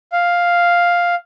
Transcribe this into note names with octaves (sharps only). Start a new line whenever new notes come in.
F5